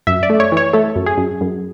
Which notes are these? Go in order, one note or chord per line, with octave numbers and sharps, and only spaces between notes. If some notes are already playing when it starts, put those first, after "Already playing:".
F#2 E5
D5
A3
C#5
E3
C#5
A3 A4
F#2
G#4
F#2
F#2